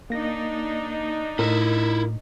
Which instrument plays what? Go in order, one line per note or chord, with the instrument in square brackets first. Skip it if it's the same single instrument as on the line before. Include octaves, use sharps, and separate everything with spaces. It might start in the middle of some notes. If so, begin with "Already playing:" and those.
[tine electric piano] A#3 A#6 [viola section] D4 D#4
[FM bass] A2 [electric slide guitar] E4 F4 [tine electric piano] A#4